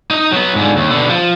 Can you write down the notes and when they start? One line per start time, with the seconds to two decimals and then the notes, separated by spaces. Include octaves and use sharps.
0.11 D#4 D#5
0.32 F#3 B3
0.56 G#2 D3
0.77 D#2
0.90 B2 D3
1.09 F3